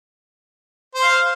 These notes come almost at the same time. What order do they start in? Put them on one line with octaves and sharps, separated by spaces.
C5 C6 F5